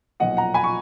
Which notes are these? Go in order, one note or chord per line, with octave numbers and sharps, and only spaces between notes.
B1 A#2 F3 D#5 F#5
F#5 A#5
G#5 B5
C#6